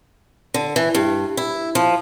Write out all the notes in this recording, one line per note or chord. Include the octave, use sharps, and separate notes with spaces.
D3
E3
G2
E4
F3